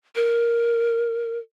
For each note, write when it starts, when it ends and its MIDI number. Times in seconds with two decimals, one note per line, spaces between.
0.16 1.39 70